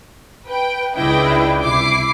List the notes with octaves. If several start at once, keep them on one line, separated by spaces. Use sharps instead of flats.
B4 G5
C#2 D4 E4 B4 D#5 G5
C2 E4 D6 C7